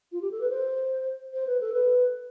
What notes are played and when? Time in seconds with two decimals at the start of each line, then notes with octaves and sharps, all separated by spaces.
0.12 F4
0.21 G4
0.31 A4
0.41 B4
0.50 C5
1.34 C5
1.47 B4
1.61 A4
1.73 B4